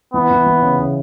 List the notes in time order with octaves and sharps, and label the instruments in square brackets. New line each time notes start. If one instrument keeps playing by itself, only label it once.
[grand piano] E3 [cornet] B3
[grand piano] E3
E3
C#3
C#3